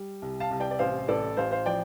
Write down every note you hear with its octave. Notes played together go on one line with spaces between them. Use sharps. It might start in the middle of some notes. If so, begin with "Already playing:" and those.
Already playing: G3
C2
F5 A5
C2
D5 G5
D5
A1 C5 F5
A1 A4 D5
A1 C5 F5
C5 F5
F3 D5 G5